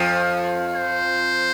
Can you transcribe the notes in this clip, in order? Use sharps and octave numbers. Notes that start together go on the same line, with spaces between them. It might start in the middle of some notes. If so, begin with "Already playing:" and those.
Already playing: F2 F3
C5